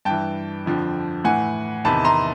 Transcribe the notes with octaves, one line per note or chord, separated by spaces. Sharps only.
G2 E3 G5 A5
F2 D3 F3
A2 E3 F#5 G#5
E2 C3 D#3 A5 B5
A#5 C6